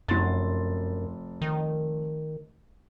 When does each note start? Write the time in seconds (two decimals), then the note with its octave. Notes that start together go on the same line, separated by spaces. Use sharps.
0.08 F1 F#2 C6 A6
1.41 D#3